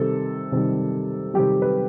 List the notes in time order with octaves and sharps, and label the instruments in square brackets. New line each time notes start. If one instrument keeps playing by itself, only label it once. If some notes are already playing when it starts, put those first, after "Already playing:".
Already playing: [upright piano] C3 D#3 G3 A4
C3 D#3 G3
C3 D#3 G3 G4
B4